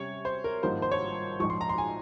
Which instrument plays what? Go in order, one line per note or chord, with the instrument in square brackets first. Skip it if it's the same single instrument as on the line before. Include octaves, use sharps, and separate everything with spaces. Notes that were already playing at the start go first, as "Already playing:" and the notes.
Already playing: [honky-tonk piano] C3 G3 C#4 [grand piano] C#5
[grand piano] C5
A#4
[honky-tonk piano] G#1 G2 F3 A#3 D#4 [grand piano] C5
[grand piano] C5
C#5
[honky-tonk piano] A#1 G#2 F3 [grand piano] C#6
[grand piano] C6
A#5
C6
G#5